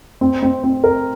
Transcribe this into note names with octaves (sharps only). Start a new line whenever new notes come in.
C4
C4
C4
A#4